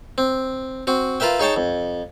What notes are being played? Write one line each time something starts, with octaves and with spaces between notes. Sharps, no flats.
C4
C4 F#4
F4 A#4 B4 E5 G5
D#4 G#4 C#5 G5 A5
F2